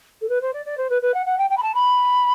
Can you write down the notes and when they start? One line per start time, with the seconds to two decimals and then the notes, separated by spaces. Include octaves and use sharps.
0.21 A4
0.29 B4
0.41 C5
0.53 D5
0.65 D5
0.77 C5
0.90 B4
1.02 B4
1.14 F#5
1.26 F#5
1.38 G5
1.50 G5
1.57 B5
1.62 A5
1.74 B5